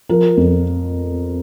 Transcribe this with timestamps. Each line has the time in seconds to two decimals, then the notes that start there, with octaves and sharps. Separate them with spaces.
0.09 F3 A#4
0.37 F2